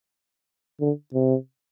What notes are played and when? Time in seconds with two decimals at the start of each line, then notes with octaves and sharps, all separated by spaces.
0.81 D3
1.14 C3